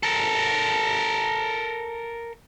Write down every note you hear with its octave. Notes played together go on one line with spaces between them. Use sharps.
A4 A#4